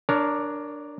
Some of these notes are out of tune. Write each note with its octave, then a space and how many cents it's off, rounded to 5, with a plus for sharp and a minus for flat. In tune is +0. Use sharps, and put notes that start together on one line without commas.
D4 +5 A#4 +0 C#5 +30